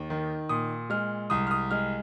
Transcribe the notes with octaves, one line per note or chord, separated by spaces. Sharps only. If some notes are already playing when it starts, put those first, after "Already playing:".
Already playing: D#2
D#3
A#2 D#6
G#3 F6
C2 D#6
F6
D#6
G#3 F6